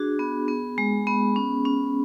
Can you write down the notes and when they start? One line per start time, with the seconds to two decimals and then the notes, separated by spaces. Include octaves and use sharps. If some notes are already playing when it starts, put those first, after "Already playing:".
Already playing: D4 F#4 G#4
0.19 B3
0.48 B3
0.78 G#3
1.07 B3
1.36 C#4
1.65 C#4